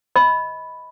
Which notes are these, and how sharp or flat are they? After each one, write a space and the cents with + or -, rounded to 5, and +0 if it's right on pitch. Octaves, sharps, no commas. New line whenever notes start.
D#5 +25 B5 +0